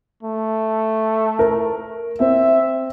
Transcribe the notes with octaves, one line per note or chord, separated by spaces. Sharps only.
A3
A#4
C4 E5